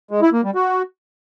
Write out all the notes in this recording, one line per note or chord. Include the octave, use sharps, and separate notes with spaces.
G#3
E4
A#3
G3
F#4